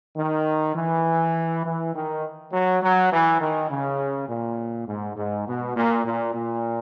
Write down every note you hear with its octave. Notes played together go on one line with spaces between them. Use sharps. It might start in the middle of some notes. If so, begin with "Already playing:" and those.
D#3
E3
E3
D#3
F#3
F#3
E3
D#3
C#3
A#2
G#2
G#2
B2
A#2
A#2
A#2